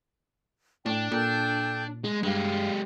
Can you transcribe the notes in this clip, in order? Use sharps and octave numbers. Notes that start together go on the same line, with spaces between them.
A2 D4 G5
A#2 A4 G5 G6
G#3
G2 G#3 G4 F5